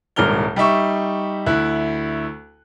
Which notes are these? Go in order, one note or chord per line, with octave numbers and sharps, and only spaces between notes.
D#1 C2 G#2 A#4 F6 G7
G3 D#4 E5 C#6
D2 E4 F#6